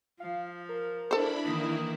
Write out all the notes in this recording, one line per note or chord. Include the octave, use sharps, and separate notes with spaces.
F3 F5
A#4
D4 E4 A4 C5 B5
D#3 E3 A#3 E4 D#6